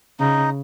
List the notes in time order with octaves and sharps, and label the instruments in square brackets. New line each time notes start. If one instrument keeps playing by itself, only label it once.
[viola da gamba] C#3 [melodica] D#4